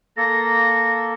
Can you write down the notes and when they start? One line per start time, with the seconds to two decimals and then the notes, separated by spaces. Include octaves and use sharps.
0.17 A#3 A4 A#6